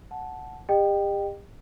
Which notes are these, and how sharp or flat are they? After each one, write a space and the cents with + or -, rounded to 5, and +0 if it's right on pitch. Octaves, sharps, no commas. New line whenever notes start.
F#5 +0 A5 -15
G4 +35 D#5 -35 G5 +0